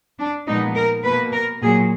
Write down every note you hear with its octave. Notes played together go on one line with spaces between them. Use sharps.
D4
A#2 F3 G#3 B3 D#4
A#4
B2 A#3 B4
A#4
A#2 F#3 A#3 G#4